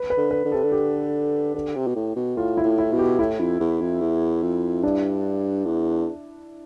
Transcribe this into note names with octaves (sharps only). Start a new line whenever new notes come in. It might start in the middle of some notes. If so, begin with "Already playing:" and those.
Already playing: B4
B4
D3
B4
D3
C3 A4
D3
G4
D3
C3
B2
A2
B2
A2 F4
E4
A2
E4
B2
G4
A2 E4
F2
E2
F2
E2
F2
G2 D4
E2